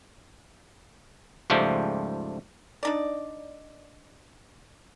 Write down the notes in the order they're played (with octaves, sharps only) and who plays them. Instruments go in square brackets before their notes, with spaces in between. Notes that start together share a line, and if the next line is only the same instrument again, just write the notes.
[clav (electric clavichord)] C#2 G#2 F3 G3 A3 G4
[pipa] D4 D#4 D5